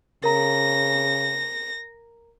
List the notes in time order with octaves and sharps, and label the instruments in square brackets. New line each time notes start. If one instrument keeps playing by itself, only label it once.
[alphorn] C#3 [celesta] A#4 A#5 [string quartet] A#6